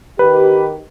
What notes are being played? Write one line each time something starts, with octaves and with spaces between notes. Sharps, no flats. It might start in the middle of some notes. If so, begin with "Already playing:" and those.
D#3 G4 B4